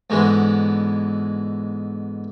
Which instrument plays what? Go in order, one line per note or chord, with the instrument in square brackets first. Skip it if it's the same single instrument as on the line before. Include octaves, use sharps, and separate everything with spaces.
[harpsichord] G#2 B2 D3 E3 G#3